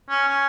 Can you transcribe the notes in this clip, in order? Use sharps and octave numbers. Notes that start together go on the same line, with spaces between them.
C#4
C#4